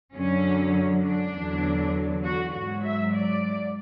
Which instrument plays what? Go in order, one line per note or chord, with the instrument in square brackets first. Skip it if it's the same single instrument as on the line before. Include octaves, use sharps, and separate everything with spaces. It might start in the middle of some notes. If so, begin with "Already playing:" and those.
[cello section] F#2 D3 F#3 C#4
D4
E2 D3 F#3
F#4
G#2 F#3 F#4
E5
D5